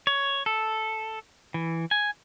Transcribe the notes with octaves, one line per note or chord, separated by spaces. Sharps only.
C#5
A4
E3
G#5